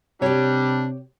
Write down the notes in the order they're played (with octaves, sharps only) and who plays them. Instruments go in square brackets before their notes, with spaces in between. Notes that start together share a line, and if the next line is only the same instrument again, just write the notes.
[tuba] C3 [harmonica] G3 D4 [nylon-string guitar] G4 C#5